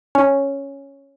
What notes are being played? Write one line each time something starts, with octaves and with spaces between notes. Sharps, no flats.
C#4